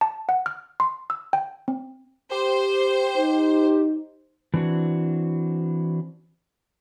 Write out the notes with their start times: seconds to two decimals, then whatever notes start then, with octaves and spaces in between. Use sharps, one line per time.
0.01 A5
0.29 F#5
0.46 F6
0.80 C6
1.10 E6
1.33 G5
1.68 C4
2.31 G4 C5
3.18 D#4
4.54 E3 C4 D4 F#4